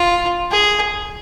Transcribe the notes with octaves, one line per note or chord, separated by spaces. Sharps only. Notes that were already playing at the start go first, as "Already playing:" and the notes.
Already playing: F4
G#4